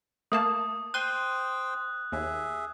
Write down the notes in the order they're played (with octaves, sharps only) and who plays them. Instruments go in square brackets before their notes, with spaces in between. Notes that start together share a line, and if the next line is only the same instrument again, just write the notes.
[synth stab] A3 A#3 A5 [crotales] D#6
[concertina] C5 G5 [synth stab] C6 D#7 [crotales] F#6
[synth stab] D#2 [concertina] G#4 E5